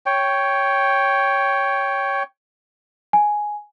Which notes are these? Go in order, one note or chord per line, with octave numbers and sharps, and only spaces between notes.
C#5 G5
G#5